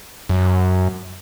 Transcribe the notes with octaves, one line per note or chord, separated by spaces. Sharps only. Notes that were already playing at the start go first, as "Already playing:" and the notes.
F#2